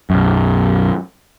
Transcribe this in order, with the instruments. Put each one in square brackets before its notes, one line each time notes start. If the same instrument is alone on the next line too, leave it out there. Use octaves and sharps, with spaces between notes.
[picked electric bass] B1 F#2